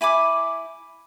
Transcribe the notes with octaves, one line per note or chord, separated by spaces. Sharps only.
E4 G#5 B5 D6